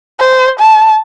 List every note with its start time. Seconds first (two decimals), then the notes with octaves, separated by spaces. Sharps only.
0.19 C5
0.59 A5